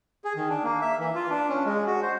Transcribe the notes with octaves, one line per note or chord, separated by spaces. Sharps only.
G#4
D#3
D4
A#3
E5
E3
F4
D4
C#4
G#3
F#4
C5